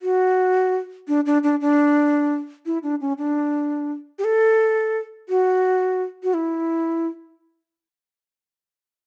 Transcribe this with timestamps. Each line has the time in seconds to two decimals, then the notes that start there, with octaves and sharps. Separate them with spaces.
0.02 F#4
1.08 D4
1.26 D4
1.43 D4
1.61 D4
2.66 E4
2.83 D4
3.01 C#4
3.18 D4
4.19 G4
4.24 A4
5.29 F#4
6.23 F#4
6.34 E4